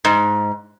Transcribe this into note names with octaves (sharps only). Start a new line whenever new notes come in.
G#2